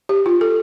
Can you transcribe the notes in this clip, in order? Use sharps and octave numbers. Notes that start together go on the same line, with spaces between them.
G4
F4
A4